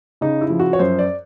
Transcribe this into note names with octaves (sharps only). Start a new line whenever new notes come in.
C#3 D#4
E4
F3
F#4
C#5
F#2 C5
D5